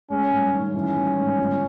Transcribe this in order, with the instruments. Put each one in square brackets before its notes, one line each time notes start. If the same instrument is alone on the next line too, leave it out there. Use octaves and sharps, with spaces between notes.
[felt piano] G#3 [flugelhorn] C#4
[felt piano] G2
D#3
[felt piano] E3 [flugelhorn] C#4
[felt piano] G3
G#2
G1